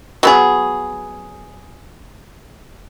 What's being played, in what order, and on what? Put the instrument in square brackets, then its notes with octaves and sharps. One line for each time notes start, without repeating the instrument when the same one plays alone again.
[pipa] F#3 B3 G#4